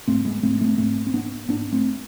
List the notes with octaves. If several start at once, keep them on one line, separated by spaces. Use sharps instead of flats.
G#2 A3 C4
G#3 B3
G#2 A3 C4
A3 C4
G#2 A3 C4
C4
G#2 B3 D4
G#2 B3 D4
A3 C4